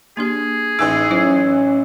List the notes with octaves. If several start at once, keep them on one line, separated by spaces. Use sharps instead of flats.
A#3 D4 G4 G#4
A1 E3 D#4 E6
F#3 C#4 E4 C5